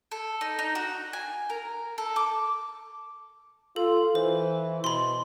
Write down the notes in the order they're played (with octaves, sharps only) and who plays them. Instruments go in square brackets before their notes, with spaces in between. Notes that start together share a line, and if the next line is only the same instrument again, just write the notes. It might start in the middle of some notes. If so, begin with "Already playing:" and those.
[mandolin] A4
D#4
D#4
F#4
G#5
A#4
A4
D6
[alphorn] F4 [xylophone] A4
[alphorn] E3 [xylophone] C5
[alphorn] B2 [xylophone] B5 C6